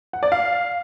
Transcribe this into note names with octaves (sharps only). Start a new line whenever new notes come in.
F#5
D5
F5